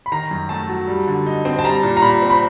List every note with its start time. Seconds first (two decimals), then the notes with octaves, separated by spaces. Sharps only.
0.06 B5
0.12 D#3 A#5
0.31 F#2
0.49 A3 A5
0.69 F#3
0.87 G3
1.07 D3
1.26 D#4
1.45 C4
1.59 A5
1.64 G3 A#5
1.83 A#2
1.97 A#5
2.02 A#2 B5
2.22 C4
2.30 B5